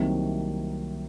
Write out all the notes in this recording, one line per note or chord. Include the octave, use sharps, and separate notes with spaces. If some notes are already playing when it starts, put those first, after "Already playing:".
Already playing: C2 C3 D#3 F#3 A#3